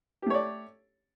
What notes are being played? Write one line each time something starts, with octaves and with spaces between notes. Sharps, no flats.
A3 G4 C#5 D5